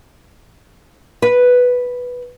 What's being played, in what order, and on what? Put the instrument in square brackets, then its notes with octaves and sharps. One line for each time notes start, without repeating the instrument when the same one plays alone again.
[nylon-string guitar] B4